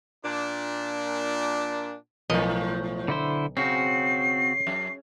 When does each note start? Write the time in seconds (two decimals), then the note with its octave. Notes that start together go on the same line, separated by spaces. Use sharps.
0.25 A#2 D4
2.30 B1 A2 F3 A#4 D#5
3.08 D3 E4 C5
3.57 C#3 C4 F#4 C7
4.67 F#2